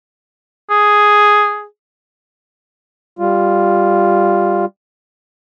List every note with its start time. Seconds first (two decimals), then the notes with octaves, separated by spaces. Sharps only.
0.70 G#4
3.19 G3 F4